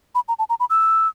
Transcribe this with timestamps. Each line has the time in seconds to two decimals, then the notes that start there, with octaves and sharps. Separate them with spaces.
0.15 B5
0.28 A#5
0.39 A5
0.50 A#5
0.60 B5
0.70 E6